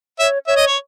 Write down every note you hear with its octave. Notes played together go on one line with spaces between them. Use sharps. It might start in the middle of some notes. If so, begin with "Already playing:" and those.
C#5 E5
C#5 E5
D#5
C#5